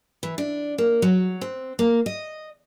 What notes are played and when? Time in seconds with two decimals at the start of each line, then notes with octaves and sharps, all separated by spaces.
0.23 E3
0.38 D4
0.78 A#3
1.02 F#3
1.41 C4
1.79 A#3
2.06 D#5